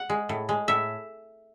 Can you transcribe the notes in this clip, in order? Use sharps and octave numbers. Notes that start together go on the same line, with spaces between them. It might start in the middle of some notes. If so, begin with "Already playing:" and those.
Already playing: F#5
G#3
A2
G#3
A2 E5